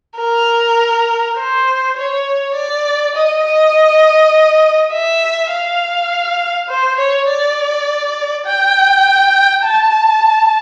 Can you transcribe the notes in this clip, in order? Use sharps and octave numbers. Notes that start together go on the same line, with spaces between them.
A#4
C5
C#5
D5
D#5
D#5
E5
F5
C5
C#5
D5
G5
A5